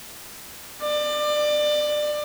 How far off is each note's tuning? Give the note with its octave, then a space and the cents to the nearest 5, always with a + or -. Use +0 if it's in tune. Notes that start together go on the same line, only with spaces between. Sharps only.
D5 +25